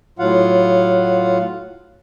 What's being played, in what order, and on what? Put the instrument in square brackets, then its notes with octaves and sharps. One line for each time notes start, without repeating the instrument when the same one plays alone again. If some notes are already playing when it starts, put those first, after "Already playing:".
[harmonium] A2 F#3 F4 F5 F#5